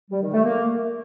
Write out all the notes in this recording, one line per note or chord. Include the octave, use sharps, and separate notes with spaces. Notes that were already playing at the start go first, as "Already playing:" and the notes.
G3
D#3
A3
A#3